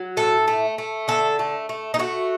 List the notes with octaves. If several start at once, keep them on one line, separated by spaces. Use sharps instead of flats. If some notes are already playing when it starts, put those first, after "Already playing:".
Already playing: F#3
A2 A4
A3
A3
D3 A4
A3
A3
D#4
A3 F#4